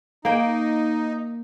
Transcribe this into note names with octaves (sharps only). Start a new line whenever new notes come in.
A#3 D#4 G5